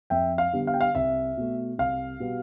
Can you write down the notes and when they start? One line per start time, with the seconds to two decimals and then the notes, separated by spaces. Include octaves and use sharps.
0.10 F2 E5 G5
0.38 F5
0.53 D3 G3 B3
0.67 F5
0.74 G5
0.81 F5
0.95 C2 E5
1.37 B2 A3
1.78 C2 F5
2.20 B2 G3 B3